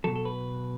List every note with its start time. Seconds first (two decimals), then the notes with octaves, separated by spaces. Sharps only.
0.04 B2 F#3 A4
0.16 A4
0.25 B4